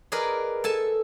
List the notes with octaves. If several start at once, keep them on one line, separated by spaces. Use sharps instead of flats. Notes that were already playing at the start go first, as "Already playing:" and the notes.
G#4 A#4 B4 D5 D#5
A4 G#5 A5